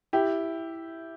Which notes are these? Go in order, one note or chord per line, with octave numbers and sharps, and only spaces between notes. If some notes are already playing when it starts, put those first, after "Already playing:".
E4 G4